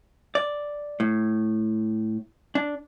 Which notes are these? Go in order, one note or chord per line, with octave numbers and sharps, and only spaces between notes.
D5
A2
D4